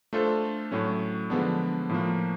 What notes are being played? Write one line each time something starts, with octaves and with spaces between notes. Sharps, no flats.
A3 D4 F4 A4 C5
A2 F#3 A3 C#4
D3 F3 G#3 B3 D4
A2 F3 A#3